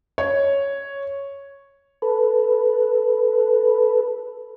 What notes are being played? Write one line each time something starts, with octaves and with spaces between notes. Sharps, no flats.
C#5
A4 B4